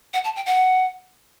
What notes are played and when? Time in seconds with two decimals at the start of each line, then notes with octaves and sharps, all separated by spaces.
0.14 F#5
0.24 A5
0.36 G5
0.46 F#5